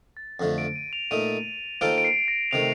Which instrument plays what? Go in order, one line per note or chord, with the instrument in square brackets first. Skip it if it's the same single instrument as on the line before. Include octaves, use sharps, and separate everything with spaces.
[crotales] A6
[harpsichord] F2 D3 F3 A3 [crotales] A#6
[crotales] D7
D#7
F7
[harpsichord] A#2 A3 D#4 [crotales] D#7
[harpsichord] D#3 A#3 F4 A4 C5 [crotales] D7
[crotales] D7
C7
A#6
[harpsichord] C3 D#3 A3 [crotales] F7